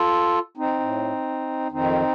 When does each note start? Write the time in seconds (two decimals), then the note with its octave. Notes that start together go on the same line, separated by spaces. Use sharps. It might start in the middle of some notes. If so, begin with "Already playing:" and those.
Already playing: F4 A4
0.57 C4 D#4
0.80 A2
1.71 F2 D#3 C4 D#4